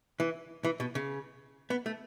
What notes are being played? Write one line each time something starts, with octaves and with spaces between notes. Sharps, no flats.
E3
E3
B2
C#3
B3
A3